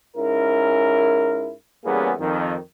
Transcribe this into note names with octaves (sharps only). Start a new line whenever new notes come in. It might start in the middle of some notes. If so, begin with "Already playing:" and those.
G#2 C#4 E4 A#4
E2 G3 A#3 B3 C#4 G#4
F2 D#3